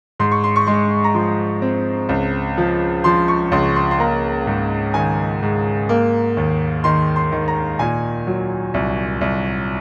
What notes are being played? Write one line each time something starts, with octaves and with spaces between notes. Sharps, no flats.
G#2 C6
C#6
C6
C#6
G#3 C6
A#5
F3 C6
C4
C#2
F3
F3 C6
C#6
C#2 C6
C6
C6
A#3 A#5
G#2
D#3 G#5
G#2
A#3
D#2
D#3 C6
C6
D#3
A#5
A#2 G#5
F#3
C2
C2